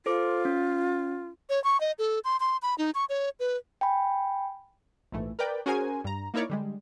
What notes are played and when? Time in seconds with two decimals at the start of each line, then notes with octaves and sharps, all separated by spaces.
0.06 F4 A4 C5 D6
0.45 C#4
1.50 C#5
1.64 C#6
1.81 D#5
1.99 A4
2.24 C6
2.40 C6
2.62 B5
2.78 D#4
2.95 C#6
3.09 C#5
3.40 B4
3.81 G5 G#5 B5
5.12 A#1 G#2 E3 A3
5.39 A#4 B4 D5 G5
5.66 C#4 F#4 G#4 A#4 C5 G#5
6.04 G2 A#5
6.34 A#3 D#4 E4 A#4 C#5 D5
6.50 D3 G3 G#3